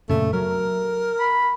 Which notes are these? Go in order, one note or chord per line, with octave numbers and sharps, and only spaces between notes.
F#2 A#2 C#3 A3
F#3 A#4
B5